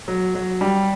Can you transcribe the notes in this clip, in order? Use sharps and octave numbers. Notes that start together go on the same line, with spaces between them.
F#3
F#3
G3